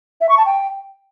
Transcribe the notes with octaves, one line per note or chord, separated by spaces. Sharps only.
E5
C#6
A5
G5